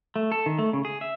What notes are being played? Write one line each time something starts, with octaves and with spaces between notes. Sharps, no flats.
A3
A4
D#3
A3
C#3
G#4
E5